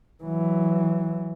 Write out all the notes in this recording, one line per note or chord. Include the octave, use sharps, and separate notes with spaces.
E3 F#3